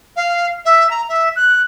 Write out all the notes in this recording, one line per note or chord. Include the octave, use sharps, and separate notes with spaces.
F5
E5
A#5
E5
F#6